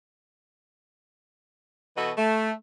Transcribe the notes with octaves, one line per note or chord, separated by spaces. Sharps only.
B2 E3 F#4 A4 B4 D#5
A3